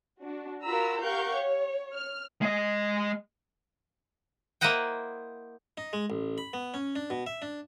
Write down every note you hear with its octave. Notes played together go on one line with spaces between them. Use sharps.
D4 F#4
F4 F#4 A#4 A#5 B5 E6
G4 A#4 F5 F#5 C#6 G6
C#5
F6
G#3 D#5
A#3 E4 C5 D#5 F#5 G5
D#4
G#3
A1
B5
B3
C#4
D4
B2
E5
D4